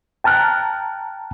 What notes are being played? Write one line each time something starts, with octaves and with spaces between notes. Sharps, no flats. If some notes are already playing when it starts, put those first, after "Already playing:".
G5 A5 A#5 F6 F#6